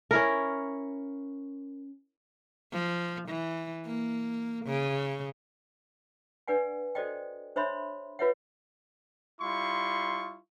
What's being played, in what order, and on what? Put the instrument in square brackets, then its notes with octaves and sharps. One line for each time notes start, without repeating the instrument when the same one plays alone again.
[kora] C#4 E4 A#4
[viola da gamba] F3
E3
A#3
C#3
[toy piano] D4 B4 D5 F#5 G#5
F#4 A4 C5 D5 D#5 G5
D4 C5 C#5 E5 B5 C6
F4 B4 C#5 E5 F#5
[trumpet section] G3 E4 F4 C6 C#6